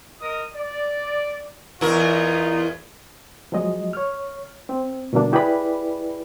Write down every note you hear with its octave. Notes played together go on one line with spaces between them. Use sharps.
A#4 D#5 D#6
D5
E2 B3 D#4 F4 A#4
F3 F#3 G#3 D#5
C#5 F6
C4
B2 D3 G3 A#3 D4
E4 G4 G#4 B4 D5 B5